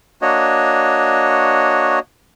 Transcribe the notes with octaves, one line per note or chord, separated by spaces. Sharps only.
A#3 D4 F#4 C#5 D#5